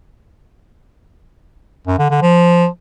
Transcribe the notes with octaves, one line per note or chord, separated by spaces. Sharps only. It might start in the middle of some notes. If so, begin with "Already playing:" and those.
F#2
D3
D3
F3